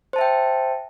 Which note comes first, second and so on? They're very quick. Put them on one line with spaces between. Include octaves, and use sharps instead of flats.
C5 A5 E5 G5